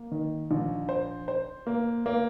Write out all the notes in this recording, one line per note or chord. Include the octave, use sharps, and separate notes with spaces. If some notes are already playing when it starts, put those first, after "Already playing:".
Already playing: A#3
D#3
A#1
C5
C5
A#3
A#3